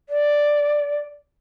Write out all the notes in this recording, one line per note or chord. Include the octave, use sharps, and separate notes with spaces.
D5